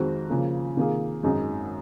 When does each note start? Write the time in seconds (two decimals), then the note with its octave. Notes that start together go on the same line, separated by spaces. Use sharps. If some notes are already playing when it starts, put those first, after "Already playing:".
Already playing: F2 D#3 G#3 C4 F#4
0.30 C#3 F3 A#3
0.76 C3 D#3 A#3 F4 G#4
1.23 G#1 F#2 D#3 G#3 D#4